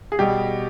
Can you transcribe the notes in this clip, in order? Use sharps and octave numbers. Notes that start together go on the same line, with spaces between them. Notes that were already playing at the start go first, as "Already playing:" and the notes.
G#4
B2 G3 G4